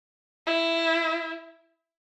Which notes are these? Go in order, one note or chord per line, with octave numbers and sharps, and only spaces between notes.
E4